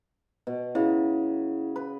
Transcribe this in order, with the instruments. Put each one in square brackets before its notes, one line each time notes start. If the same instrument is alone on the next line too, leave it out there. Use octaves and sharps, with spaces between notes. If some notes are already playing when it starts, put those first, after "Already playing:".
[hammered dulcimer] B2
[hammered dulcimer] C#3 [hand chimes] E4
[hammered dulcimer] B4